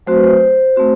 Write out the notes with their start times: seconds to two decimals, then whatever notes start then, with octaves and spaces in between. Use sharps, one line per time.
0.07 F#3 A3 C4 F#4 C5
0.16 B4
0.24 C5
0.76 A3 C4 F#4